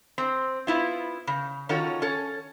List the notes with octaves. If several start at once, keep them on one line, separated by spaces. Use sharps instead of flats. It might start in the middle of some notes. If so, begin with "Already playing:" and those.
C4
B3 E4 F4
C#3
D#3 C#4 F4 F#4 A4 C#5
C#4 A4